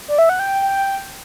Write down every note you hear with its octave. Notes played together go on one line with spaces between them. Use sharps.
D5
E5
F#5
G5